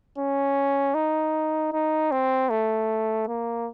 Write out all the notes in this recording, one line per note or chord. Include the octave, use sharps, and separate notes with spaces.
C#4
D#4
D#4
C4
A3
A#3